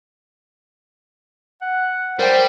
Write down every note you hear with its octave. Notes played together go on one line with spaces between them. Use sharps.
F#5
G3 A#4 C5 G5